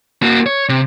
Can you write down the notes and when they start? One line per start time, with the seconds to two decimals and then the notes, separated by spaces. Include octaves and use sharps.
0.22 A#3 F#4
0.46 C#5
0.69 C3